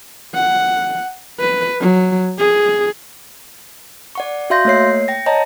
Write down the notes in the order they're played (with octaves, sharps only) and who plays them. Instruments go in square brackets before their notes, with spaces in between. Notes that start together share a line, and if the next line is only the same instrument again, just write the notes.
[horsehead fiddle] F#5
B4
F#3
G#4
[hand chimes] D5 F#5 C#6
F#4 E5 F5 C6 G6 A#6
A3 A#3 C#5 C7
G5 A#6
C#5 D#5 G5 A5 A#5